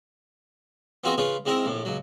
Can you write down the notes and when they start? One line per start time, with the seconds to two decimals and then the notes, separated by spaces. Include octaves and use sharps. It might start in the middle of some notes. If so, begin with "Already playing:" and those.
1.04 B3 C4 F4 F#4 G#4 D#5
1.18 C#3 F4 G#4 B4 C#5
1.46 G#2 G#3 C4 E4 A#4 D#6
1.66 A#1 A2
1.85 C#2 F#3